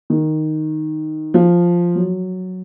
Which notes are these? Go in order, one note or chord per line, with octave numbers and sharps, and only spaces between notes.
D#3
F3
F#3